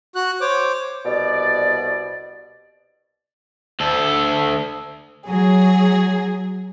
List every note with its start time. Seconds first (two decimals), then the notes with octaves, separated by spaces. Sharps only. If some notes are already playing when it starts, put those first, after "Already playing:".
0.15 F#4 F#6
0.41 C5 C#5 D6
1.05 C2 B2 D5
3.80 D2 A4
5.26 F#3 G#4